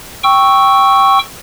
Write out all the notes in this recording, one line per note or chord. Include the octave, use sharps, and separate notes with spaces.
G5 C#6 E6